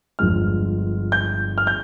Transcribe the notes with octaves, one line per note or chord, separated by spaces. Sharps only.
G1 G2 F3 G#3 F6
G6
F6
G6